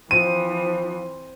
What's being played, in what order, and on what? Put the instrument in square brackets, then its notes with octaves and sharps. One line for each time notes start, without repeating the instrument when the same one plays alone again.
[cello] E3 [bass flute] F3 [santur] C4 [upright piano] D#7